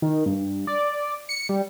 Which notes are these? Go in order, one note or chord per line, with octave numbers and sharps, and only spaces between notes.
D#3
G2
D5
C#7
G3